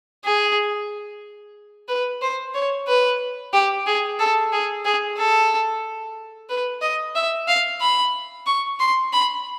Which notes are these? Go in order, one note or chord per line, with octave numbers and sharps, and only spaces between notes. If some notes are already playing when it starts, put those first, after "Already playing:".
G#4
B4
C5
C#5
B4
G4
G#4
A4
G#4
G#4
A4
B4
D#5
E5
F5
B5
C#6
C6
B5